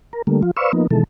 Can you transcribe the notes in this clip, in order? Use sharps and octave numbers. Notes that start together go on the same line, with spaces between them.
A#4
D3 G3 A3 A#3
F3 F4
B4 C5 D5 F5 C#6 E6
F3 A#3 B3 D#4
B2 D#3 E3 G#3 A4